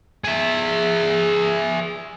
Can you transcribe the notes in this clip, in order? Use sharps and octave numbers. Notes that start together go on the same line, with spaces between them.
G#4 E5